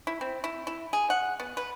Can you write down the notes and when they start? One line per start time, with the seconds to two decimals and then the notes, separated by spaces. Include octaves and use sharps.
0.07 E4
0.21 C4
0.44 E4
0.67 E4
0.93 G#4
1.10 F#5
1.40 B3
1.57 B4